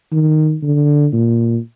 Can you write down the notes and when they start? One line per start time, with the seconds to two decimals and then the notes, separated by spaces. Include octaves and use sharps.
0.12 D#3
0.63 D3
1.13 A#2